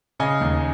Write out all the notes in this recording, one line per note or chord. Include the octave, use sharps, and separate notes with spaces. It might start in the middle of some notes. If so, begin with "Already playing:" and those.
C#3 D#5 G#5
D#2